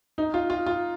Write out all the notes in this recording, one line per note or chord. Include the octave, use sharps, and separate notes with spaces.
D#4
F4
F4
F4